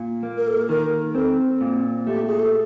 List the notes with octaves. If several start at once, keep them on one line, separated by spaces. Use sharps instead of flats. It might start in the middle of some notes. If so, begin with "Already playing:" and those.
Already playing: A#2
A#3
A#4
A4
A#4
D#3 A#4
C4 A4
A#2
A3 G4
G#4
A4